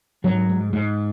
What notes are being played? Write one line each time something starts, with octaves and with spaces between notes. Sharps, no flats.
G#2 F#3
G#2
G#2